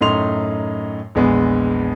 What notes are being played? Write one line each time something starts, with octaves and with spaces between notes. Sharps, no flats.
F#2 A2 D#4 C6 F7
A#1 E2 G#3 B3